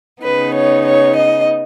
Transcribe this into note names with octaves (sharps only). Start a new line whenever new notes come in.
C#3 B3 D#4 B4
C#5
C#5
D#5